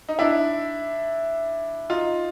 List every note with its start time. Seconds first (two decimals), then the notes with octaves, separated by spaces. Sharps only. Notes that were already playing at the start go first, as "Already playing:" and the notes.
0.09 D#4
0.19 D4 E4
1.90 D#4 F4